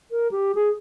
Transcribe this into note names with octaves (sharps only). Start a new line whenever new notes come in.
A#4
G4
G#4